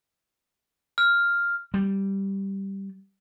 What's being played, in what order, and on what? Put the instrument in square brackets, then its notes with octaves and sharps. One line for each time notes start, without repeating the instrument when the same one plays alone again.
[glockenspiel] F6
[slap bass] G3